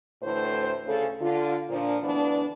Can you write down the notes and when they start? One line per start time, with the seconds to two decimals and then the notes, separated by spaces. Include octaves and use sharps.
0.22 D2 A2 E3 A3 C5
0.86 D2 C#3 A4
1.21 D3 F4
1.70 A#2 F3 D4
2.03 D2 E3 B3 D4